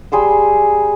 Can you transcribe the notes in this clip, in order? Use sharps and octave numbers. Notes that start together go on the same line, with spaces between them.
G3 G#4 C6 E6